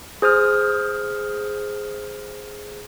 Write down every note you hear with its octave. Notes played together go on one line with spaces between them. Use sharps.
G#4 C5 D#6 F6